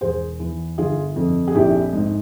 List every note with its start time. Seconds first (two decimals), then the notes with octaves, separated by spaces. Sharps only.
0.01 E1 G#4 C5
0.40 E2
0.78 G1 F4 G#4
1.16 F2
1.47 G#4
1.55 A#1 E4 G4
1.93 G#2